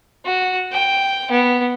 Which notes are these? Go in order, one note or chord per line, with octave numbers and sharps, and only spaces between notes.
F#4
G5
B3